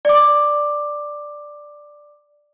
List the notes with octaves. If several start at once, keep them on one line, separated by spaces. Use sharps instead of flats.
D5 D6